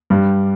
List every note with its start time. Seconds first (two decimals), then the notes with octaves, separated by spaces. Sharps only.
0.10 G2 G3